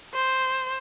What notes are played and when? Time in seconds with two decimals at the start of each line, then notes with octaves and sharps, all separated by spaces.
0.14 C5